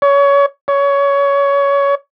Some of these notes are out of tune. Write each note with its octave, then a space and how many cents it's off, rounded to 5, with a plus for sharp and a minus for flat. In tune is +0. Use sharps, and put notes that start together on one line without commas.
C#5 +25
C#5 +20